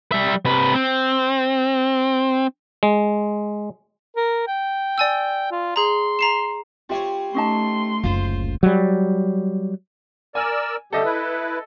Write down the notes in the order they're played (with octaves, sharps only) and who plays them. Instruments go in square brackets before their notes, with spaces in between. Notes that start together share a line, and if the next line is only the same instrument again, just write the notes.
[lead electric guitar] G3 E5
C3 B4
C4
[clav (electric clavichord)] G#3
[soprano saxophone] A#4
G5
[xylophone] D5 G#5 E6
[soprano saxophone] F4
[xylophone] G#4 A#5 [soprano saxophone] C6
[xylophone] A#5 C7 E7
[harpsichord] G3 C4 C#5 [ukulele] F4 E5
[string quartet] A3 C6 [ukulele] C#4 D#4 A5
[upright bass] F#1 D2 [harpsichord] F4 C5
[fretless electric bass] F#3 G3
[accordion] A#4 D5 E6 [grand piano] G#5
[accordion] D3 G3 G4 [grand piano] A4 D#5 E5
[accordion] E4 B4